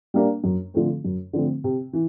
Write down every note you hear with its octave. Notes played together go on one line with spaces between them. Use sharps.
G3 A#3 D4
F#2
D3 F3 A3 C4
F#2
D3 F3 A3 C4
C3
E3